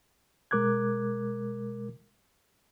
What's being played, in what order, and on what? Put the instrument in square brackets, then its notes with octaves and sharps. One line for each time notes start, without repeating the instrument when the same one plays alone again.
[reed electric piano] B2 G#3 A#4 D6 F#6 G#6